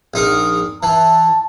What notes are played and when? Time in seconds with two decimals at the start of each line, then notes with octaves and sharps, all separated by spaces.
0.14 A#1 D#4 A#4
0.83 E3 A5